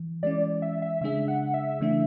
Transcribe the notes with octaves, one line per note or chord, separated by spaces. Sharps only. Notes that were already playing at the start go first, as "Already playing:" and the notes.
Already playing: E3
E3 G#3 C#4 D5
E5
E5
C#3 G#3 D4 G#4 E5
F#5
E5
C#3 E3 A3 D4